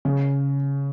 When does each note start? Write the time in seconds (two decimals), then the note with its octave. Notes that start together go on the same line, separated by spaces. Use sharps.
0.05 C#3